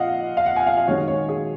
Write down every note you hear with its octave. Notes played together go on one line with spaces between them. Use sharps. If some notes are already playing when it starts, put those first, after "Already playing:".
Already playing: A#2 D#5 F5 F#5
F5
F#5
G#5
F5
F5
F#2 D#3 G#3 C#4 C#5
C#5
G#4